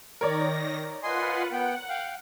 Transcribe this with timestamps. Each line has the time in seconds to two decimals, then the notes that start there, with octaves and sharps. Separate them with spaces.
0.21 D#3 A#4 C#5 D5 A#6
1.03 F4 B4 D#5 F#5 G#5 C6
1.52 B3 F#5 G5
1.89 F5 G5